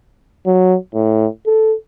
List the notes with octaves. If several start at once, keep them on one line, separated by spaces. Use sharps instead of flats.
F#3
A2
A4